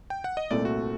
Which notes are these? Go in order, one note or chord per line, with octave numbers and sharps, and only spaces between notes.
G5
F#5
D#5
C2 A#2 A3 C4 D5
F#4